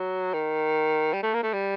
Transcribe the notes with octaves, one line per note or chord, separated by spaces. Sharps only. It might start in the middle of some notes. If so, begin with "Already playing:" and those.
Already playing: F#3
D#3
G3
A3
A#3
A3
G3